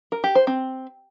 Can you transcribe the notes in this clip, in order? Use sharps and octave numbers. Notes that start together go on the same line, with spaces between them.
A#4
G4
C5
C4